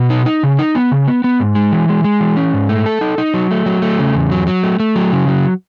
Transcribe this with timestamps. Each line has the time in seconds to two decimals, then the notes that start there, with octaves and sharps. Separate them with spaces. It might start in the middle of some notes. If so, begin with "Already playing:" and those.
Already playing: B2
0.10 D#4
0.26 D#4
0.43 C#3
0.59 D#4
0.75 B3
0.91 C#3
1.08 B3
1.24 B3
1.40 G#2
1.55 G#3
1.72 E3
1.89 G#3
2.04 G#3
2.20 E3
2.37 C#4
2.53 G#2
2.69 A3
2.86 A4
3.01 D#4
3.18 D#4
3.34 F#3
3.51 A3
3.66 F#3
3.82 A3
3.99 C#3
4.15 E2
4.32 F#3
4.47 F#3
4.63 A3
4.80 A3
4.96 F#3
5.12 C#3
5.28 F#3